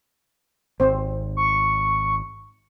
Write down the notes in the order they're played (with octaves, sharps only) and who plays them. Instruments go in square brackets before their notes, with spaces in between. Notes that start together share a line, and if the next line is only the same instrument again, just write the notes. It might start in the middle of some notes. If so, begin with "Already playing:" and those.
[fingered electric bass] G#1 [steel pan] C4 C5
[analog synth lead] C#6